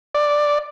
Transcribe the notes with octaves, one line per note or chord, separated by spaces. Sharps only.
D5